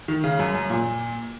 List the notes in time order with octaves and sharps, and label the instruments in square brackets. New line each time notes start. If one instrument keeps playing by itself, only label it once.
[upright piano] D#3
C#3
F#2
F#2
A#2